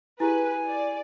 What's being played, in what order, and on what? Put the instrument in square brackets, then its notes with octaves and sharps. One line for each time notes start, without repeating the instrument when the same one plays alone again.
[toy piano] E4 G4 G#4 [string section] B4 [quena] G#5
[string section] D5